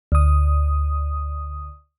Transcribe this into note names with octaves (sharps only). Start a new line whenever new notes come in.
D2 D#6